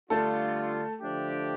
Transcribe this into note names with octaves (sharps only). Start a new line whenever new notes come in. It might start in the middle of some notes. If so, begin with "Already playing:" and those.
D3 G3 A3 D4 F4 A4
D3 F3 A3 D4 G4